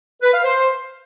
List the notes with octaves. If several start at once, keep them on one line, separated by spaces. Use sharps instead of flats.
B4
F5
C5